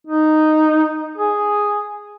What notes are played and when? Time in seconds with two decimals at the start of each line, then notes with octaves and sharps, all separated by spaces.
0.07 D#4
1.18 G#4